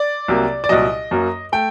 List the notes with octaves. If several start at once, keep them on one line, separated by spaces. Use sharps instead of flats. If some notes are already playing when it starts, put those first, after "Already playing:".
Already playing: D5
C2 C3 F#3 A#3
D5
C2 A#2 F#3 D#5
F#2 F#3 A#3
A3 G5